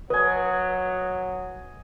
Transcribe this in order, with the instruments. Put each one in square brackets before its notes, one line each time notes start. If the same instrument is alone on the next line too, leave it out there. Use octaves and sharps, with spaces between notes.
[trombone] F#3 [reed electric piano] B4 [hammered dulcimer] D#5 G#5